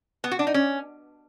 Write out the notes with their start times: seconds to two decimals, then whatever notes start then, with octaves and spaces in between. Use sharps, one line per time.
0.24 B3
0.31 F#4
0.39 D4
0.47 D#4
0.54 C#4